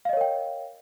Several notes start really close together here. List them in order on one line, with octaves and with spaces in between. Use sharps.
F5 D#5 C#5 A#4 G5